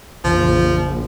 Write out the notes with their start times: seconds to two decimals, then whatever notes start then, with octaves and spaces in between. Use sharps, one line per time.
0.25 A#1 F2 C#3 E3 F3